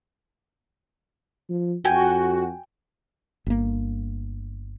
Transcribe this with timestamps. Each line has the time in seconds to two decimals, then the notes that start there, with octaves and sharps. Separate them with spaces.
1.49 F3
1.85 F2 F#4 G5 G#5
3.46 G1 A#3